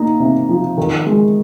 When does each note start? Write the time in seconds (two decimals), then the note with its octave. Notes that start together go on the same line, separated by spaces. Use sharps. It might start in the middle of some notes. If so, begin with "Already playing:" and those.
Already playing: A#3 D#4
0.20 C3
0.49 F3
0.78 D#3
1.07 G#3